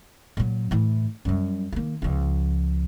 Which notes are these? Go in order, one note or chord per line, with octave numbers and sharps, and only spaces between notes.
A#2 F#3
A2 E3
F#2 G3
D#3 A#3
C#2 F3